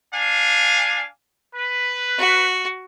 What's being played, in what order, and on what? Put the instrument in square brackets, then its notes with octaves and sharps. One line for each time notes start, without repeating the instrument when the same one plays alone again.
[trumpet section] D4 F5 G#5
B4
[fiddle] F#4